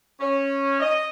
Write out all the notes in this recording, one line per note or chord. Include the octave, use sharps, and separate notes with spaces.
C#4
D#5